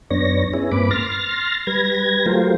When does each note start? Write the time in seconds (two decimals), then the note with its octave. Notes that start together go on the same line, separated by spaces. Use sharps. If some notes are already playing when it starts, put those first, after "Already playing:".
0.11 F#2 B3 D4 C#5 A#6
0.54 B3 C#4 E4 G#4
0.72 G2 A#3 C4 B4 B5 D6
0.91 C6 F6 A6 A#6
1.67 G3 B4 G#6 A#6
2.26 F#3 A3 F4 G4 A#4 C5